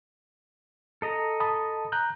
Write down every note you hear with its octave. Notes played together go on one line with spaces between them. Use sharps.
A4 D#5 A#5
A5 B5 D#6
A#5 F#6 G6